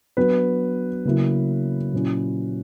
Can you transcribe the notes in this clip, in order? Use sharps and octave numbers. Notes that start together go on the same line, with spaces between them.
F#3 B3 D4 B4
C#3 F#3 A#3 E4
A#2 F#3 C#4 E4